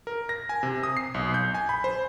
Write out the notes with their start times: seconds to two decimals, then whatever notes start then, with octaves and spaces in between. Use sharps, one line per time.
0.07 A#4
0.29 A#6
0.49 G#5
0.63 C3
0.83 D#6
0.97 C7
1.14 B1
1.34 G6
1.55 G#5
1.69 B5
1.84 C5